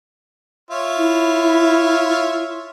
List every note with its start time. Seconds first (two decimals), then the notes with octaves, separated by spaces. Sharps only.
0.71 F4 C#5 E5
0.98 E4